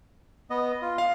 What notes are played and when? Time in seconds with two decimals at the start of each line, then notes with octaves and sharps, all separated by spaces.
0.50 B3 D#5
0.82 F4
0.98 F5